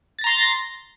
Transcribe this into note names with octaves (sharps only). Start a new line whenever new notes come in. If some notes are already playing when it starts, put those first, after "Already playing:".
A#5 C6 A6 A#6